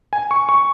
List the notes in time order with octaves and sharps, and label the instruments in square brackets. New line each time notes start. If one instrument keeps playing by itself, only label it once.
[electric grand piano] G#5
C#6
C#6